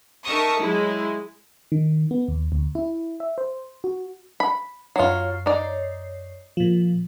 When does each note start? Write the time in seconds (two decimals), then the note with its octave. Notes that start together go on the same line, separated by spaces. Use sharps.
0.25 D#4 A#4 E5 A5 C#6 D#6
0.59 F#3 G#3 E4
1.72 D#3
2.11 B3
2.28 D#2
2.52 D2
2.75 E4
3.20 E5
3.38 C5
3.84 F#4
4.40 B5
4.96 F#2 F#3 F4 C#5 C7
5.46 D#4 D5
6.57 A#2 F3